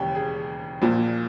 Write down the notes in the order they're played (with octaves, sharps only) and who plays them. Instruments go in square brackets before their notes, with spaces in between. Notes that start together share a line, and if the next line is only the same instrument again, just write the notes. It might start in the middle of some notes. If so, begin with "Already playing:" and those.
Already playing: [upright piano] E1 D#2 C#3 G4
G#4
A#1 A#2